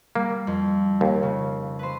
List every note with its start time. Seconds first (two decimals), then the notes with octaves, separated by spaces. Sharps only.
0.15 G3 A#3
0.47 F2
1.01 D#2
1.23 C#3
1.79 B4 C5